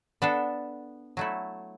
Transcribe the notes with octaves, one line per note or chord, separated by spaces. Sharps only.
B3 D4 A4
F#3 A3 E4